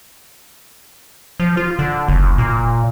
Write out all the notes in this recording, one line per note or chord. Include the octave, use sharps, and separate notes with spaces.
F3
F4
D3
F#1
A#2